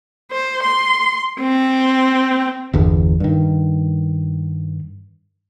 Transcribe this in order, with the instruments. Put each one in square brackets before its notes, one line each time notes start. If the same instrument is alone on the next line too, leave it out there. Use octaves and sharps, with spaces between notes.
[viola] C5
C6
C4
[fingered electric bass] G1 E2
G2 D#3